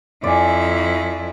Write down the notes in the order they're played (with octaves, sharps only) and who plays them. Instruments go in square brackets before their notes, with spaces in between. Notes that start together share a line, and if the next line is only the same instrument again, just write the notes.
[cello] F2 E4 [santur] D5 G#5